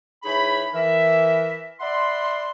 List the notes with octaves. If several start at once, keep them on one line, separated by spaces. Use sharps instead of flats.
E3 D#4 G#4 C#5 B5
E3 A#4 E5
D5 E5 F#5 B5 C6